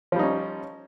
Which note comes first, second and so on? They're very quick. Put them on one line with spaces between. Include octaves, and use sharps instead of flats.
F3 G3 D#4 C#4